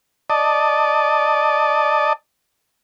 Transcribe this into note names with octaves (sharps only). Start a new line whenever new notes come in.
D5 D#5 A5